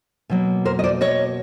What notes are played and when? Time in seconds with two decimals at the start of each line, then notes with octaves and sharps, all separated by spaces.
0.30 B2 F#3 A#3
0.65 A#4 C5
0.79 D#5
0.84 C5 D5
1.01 C#5 D#5